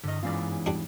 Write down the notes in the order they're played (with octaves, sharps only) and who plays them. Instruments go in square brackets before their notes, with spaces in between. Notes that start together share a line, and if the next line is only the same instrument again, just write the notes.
[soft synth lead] G2 [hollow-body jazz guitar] D3 D#5
[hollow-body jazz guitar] E2 G#2 D5 [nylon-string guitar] E3 C#4 F4
[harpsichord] G3 D4